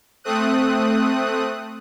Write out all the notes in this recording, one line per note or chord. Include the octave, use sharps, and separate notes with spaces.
A3 C4 D#6 F#6